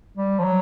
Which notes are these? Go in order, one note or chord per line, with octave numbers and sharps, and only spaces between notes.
G3
F3
F#3